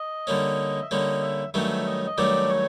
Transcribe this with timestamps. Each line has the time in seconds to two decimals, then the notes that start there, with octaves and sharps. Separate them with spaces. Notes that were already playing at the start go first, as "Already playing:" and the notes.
Already playing: D#5
0.27 D3 G3 A#3 C#4
0.82 E5
0.91 D3 G3 A#3 C#4 D#5
1.22 E5
1.54 G2 D#3 F#3 A3 C#4 E5
1.86 D#5
2.06 D#5
2.17 G2 D#3 F#3 A3 C#4 D5
2.49 C#5